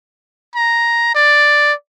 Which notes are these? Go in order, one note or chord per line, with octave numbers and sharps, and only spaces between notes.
A#5
D5